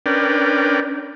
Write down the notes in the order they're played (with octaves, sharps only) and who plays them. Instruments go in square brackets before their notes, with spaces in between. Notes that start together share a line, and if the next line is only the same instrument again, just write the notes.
[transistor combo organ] C#4 D4 A#4 B4 D5 G5